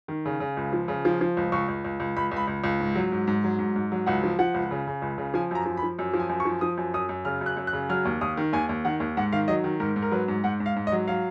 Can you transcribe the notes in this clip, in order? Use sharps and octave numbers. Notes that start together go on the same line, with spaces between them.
D#3
C#3
C#3
C#2
F3
C#3
F3
F3
C#2
C#2 C#6
C#2
C#2
C#2
C#2 B5
C#2
B5
C#2
C#2
G#2
F#3
G#2
G#2
F#3
G#2
G#2
F#3
C#2 F#5
F3
F3 F#5
C#2
C#3
C#3
C#2
C#3
F3 G#5
F#2 A#5
F3
B5
F3
F#2
F3
G#5
F#2
C#6
F3
F3 D#6
F#2
F#2 D#6
F#2
C#3 F6
F#2
F#6
F#2
F#6
C#3
F#3 F6
D#2
D#2 D#6
D#3
D#2 G#5
D#2
D#3 F#5
D#2
G#2 F#5
D#3 F5
F#3 D#5
D#3
G#2 A#4
G#2
A#4
F#3 B4
G#2
G#2 F#5
G#2
F5
G#2
D#5
F#3
F#3 F5